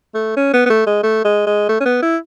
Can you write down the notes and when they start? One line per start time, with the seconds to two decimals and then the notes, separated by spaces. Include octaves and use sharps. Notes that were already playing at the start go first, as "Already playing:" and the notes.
0.14 A3
0.37 C#4
0.53 B3
0.66 B3
0.70 A3
0.87 G#3
1.03 A3
1.25 G#3
1.47 G#3
1.69 A3
1.80 C#4
1.86 B3
2.02 E4